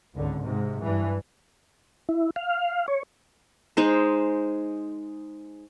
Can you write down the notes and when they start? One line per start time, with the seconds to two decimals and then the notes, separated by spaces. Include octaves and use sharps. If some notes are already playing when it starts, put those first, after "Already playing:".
0.13 G#1 C#2 D3
0.44 G#2 C3
0.80 G2 E3
2.09 E4
2.36 F5
2.88 C#5
3.77 G#3 D#4 C5